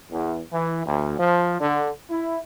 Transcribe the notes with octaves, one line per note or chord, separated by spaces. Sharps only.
E2
E3
D2
F3
D3
E4